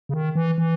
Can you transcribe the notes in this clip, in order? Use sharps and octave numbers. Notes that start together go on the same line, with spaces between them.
C#3
D#3
E3
E3